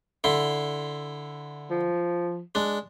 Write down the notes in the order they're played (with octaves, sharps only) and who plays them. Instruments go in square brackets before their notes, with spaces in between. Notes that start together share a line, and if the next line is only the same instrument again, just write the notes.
[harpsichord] D3 E4 C6
[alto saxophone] F3
[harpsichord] G#3 D4